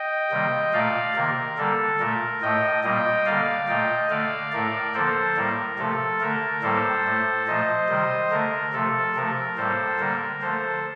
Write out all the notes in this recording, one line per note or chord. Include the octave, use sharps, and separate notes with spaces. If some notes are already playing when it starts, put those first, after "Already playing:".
Already playing: D#5 G5
C3 D#3 G3 A#3
A#2 A3 D5 F5
C3 D#3 A#3 A#4
D3 G3 A#3 A4
A#2 A3 A#4
A2 A3 D#5 G5
A#2 G3 A#3 D#5 G5
D3 G3 A#3 D5 F5
A#2 A3 D#5 G5
D3 A3 D5 F5
A2 A3 A#4 D5
D3 F3 A#3 A4 C5
A2 G3 A#3 A#4
C3 F3 A3 A4
D3 A3 A#4
A2 G3 A#3 A4 C5
A2 A3
A#2 F3 A3 C5 D#5
C3 D#3 G3
D3 A3 A#4
C3 F3 A3 A4
C3 F3 A3 A#4
A2 G3 A#3 A4 C5
D3 G3 A#3 A#4
D3 F3 A3 A4 C5